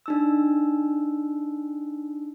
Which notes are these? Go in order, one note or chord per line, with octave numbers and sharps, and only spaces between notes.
D4 D#4 E6